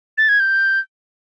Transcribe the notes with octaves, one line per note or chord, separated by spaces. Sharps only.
A6
G#6
G6